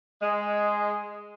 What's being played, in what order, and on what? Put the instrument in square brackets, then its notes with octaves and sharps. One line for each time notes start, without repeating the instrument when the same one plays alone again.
[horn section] G#3